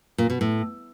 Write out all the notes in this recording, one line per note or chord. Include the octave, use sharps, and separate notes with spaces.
A#2
B2
A2